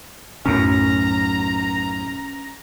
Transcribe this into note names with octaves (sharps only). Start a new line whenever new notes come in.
B1 F#2 A2 C#4 A#5